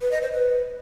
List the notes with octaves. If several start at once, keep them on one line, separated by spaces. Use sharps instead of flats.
B4
D#5
C5
B4